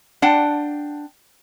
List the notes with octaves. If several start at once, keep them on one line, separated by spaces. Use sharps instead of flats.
D4 F#5 G5 A5